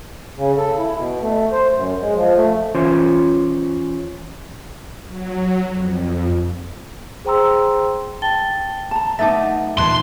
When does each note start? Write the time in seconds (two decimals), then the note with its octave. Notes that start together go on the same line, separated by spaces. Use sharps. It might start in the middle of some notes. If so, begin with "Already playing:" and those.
0.37 C#3
0.57 A4
0.77 E4
0.95 B2
1.20 A3
1.52 C5
1.75 F#2
2.01 G#3
2.15 F3
2.35 A3
2.74 E3 C#4 F4 C5 C#5
5.07 F#3
5.72 F2
7.25 G#4 C5 G5 A#5 C6 E6
8.22 G5 A5 A6 G7
8.91 A5 A#5
9.19 A3 B3 D#4 E5 A5 D6 A6
9.77 D#2 A#2 E3 E5 A5 C6 F#6 G#6